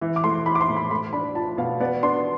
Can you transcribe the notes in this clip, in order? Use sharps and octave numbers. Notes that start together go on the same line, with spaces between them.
E3
D6
A3 C6
E4 B5
D6
C6
A2
B5
A3 B5
D4 B5
F4 A5
B2 F5
B3 D5
D4 C6